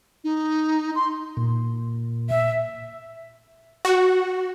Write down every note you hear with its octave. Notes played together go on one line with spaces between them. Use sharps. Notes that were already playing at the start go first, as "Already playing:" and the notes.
D#4
C6
A#2
E5
F#4